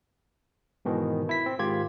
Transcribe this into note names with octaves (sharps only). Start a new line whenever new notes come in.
G#2 B2 D#3 E3
E4 B6
C4
G#2 D#3 F4 G4 G#6